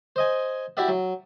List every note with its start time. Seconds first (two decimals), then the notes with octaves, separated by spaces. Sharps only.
0.16 C5 D#5 G#5
0.77 E4 F#4 G4 D5 E5 F#5
0.88 F#3